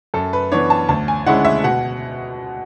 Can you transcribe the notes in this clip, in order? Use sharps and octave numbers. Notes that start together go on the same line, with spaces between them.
F#2 A4
B4
E3 B3 D4 C#5
A5
D2 A5
G#5
D3 G#3 C#4 E4 F#5
E5
B2 F#5